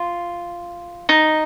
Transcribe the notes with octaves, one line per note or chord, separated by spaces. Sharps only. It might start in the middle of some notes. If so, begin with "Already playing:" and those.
Already playing: F4
D#4